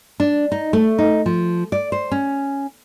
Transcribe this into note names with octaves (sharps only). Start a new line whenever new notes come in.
D4
D#4
A3
D#4
F3
D5
C5
C#4